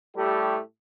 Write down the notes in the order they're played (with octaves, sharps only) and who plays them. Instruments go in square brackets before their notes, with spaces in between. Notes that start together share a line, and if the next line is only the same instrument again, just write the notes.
[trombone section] A2 G3 A3 G4